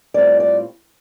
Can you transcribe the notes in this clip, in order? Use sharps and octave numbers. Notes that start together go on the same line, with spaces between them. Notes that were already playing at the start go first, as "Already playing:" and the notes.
A2 G3 C4 F4 D5
D5